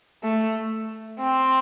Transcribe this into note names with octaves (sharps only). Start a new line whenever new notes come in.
A3
C4